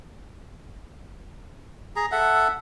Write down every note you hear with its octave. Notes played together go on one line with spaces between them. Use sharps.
G#4 A#5
A4 E5 F#5